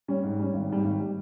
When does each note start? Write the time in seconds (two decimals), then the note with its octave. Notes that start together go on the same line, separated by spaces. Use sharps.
0.08 G3 C#4
0.23 G#2
0.39 G3 C#4
0.54 G#1
0.69 G#2 G3
0.84 G#1
1.00 G3